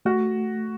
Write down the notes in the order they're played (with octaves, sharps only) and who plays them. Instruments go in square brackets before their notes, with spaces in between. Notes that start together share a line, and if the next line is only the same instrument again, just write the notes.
[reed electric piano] A3 [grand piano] F#4